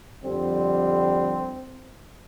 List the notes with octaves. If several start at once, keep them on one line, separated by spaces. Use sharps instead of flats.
F2 D3 G3 C4